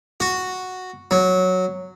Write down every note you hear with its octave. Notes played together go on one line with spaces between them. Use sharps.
F#4
F#3